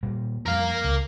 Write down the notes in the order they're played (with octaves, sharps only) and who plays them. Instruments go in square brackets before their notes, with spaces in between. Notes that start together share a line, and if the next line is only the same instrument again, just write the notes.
[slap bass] A#2 G3 A#3
[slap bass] F2 G3 [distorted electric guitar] A#4 F5
[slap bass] C#2